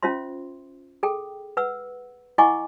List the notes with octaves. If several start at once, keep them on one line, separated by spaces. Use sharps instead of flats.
C#4 F4 C5 E5 C6
G#4 A4 G5
B4 F#5 E6
E4 D#5 F#5 G#5 C#6 D6